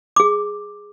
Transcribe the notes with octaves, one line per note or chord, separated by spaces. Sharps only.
G#4 D6